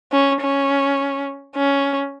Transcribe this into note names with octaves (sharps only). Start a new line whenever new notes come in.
C#4
C#4
C#4